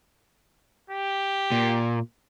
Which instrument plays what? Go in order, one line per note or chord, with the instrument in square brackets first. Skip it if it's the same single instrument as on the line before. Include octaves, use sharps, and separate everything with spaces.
[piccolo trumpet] G4
[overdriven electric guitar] A#2